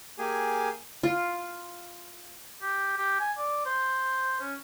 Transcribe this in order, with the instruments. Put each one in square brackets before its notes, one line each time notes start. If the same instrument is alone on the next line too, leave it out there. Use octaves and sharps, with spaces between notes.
[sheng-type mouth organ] A#3 G4 G#4 G#5
[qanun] F4
[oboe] G4
G4
G#5
D5
C5
C#4